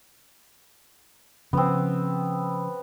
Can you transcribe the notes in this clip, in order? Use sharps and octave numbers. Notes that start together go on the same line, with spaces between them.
C#3 F3 B3 C4